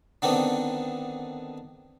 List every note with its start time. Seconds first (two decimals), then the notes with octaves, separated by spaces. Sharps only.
0.22 D3 D#3 B3 C4 D4 D#4